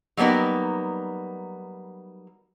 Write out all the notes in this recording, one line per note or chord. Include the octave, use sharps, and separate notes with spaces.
F#3 G3 A#3 B3 D#4